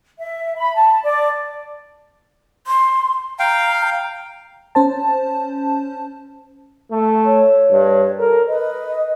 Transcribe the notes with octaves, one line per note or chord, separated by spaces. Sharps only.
E5
B5
A5
D5
C6
F5 G5 A#5
C#4 C5 A5
A3
C#5
G2
A4 A#4
B4 D#5